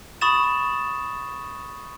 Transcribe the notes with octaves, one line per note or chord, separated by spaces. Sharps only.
B5 C#6 D#6 A6 E7